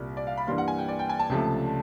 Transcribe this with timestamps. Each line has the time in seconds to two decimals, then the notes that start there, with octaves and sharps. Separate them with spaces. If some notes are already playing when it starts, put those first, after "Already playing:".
Already playing: C2 A#2 G3
0.17 D5
0.27 F5
0.37 B5
0.47 G2 E3 G3 A#3 C6
0.58 F#5
0.68 G#5
0.78 G5
0.89 D5
0.99 G5
1.09 G#5
1.19 A5
1.30 C#2 C3 F3 A3